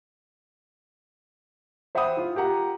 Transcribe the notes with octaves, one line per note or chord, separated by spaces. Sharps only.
C5 E5 F#5 G5 B5 D#6
E4 F4
F4 G4 A#4 F#5 A#5